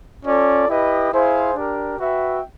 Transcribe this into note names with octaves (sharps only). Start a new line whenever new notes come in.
C#4 F4 A4 D5
E4 G4 B4 D#5
E4 G#4 C5 F5
D4 G4 A#4
F#4 B4 E5 G5